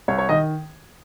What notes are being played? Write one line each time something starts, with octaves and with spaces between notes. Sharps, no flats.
C2 C#5
C#5
D#3 D#5